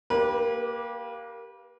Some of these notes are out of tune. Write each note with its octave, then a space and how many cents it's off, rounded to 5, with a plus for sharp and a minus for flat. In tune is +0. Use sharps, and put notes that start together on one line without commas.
A#3 +0 G4 +0 B4 -35